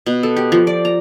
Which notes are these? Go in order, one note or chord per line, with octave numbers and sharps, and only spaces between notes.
B2
A4
G4
F3
D5
A#5